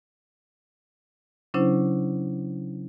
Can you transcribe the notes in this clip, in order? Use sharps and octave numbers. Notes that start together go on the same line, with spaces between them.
C#3 F#3 C#4 D4 E4 C5